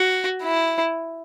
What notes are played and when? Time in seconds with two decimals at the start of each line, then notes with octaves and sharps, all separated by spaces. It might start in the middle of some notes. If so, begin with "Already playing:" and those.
Already playing: F#4
0.43 E4